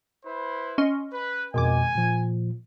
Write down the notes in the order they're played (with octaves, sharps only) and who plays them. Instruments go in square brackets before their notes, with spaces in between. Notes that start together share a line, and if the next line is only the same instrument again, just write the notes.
[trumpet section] E4 B4 C5
[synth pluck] C#4 D#5 C6
[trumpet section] B4
[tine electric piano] F2 B2 [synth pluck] D#3 G#3 D6 [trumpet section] G#5
[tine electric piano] A#2 F3